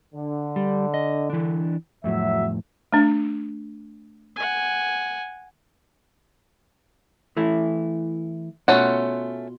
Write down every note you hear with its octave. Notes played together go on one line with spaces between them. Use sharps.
D3
G3
D#5
E3 D4
F2 A2 F#3 E5
A3 D4
F#5 G#5
E3 A3 E4
B2 A3 C#4 F4 F#5